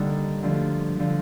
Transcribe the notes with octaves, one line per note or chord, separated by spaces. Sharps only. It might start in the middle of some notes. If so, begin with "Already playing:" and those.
Already playing: D#2 D3 G3 D#4
D2 D3 F3
D3 F3